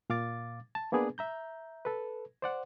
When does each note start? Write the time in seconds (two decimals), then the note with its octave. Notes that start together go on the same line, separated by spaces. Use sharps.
0.10 A#2 F5 D6 A6
0.75 A5
0.92 A#3 B3 D4 G#4 B4 D5
1.18 E5 A#5 G6
1.85 A4 B4
2.42 C5 D5 F#5